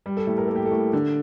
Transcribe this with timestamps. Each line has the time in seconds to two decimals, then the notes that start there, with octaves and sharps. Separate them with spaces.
0.06 G3
0.17 A4
0.27 A2 G4
0.38 A#4
0.47 A#3 A4
0.56 G4
0.65 A4
0.71 A2
0.93 D3